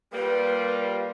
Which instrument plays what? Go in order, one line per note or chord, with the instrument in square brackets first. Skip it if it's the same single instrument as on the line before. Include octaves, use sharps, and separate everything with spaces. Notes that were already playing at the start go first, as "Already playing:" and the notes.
[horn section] G3 A#3 F4 [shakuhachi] B4